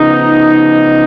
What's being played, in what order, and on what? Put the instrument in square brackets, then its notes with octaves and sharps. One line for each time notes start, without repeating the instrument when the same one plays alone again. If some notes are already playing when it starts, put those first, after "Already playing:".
Already playing: [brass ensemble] C#3 F3 B3 D#4